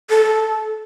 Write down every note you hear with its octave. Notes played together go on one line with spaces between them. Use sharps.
A4